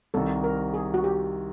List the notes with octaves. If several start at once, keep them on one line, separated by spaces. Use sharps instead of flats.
C2 C3 D#3 A4
A#4
G#4
F#4
G4